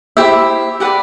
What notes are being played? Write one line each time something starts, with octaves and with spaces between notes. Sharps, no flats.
E4 G4 C5 E5
G4 B4 D5 F#5